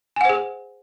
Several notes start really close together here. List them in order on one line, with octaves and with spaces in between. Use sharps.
G#5 F#5 C5 G#4